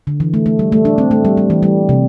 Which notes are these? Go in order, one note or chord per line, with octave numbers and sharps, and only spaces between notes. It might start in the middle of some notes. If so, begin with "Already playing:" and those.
D3
E3
A3
A3
G3
A3
D4
C4
A3
G3
G3
E3
G3
C3